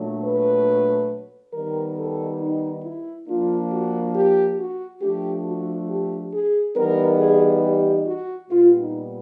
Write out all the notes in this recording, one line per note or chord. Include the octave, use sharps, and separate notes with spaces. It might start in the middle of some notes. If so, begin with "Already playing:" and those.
Already playing: A#2 F#3 A3 D4
B4
D#3 G3 B3 A#4
A4
D#4
E4
F3 A#3 D4 F4
F#4
G4
F#4
F3 A3 D4 G4
F#4
G4
G#4
E3 G3 B3 D#4 A#4
G#4
G4
F#4
A#2 G3 B3 F4
D#4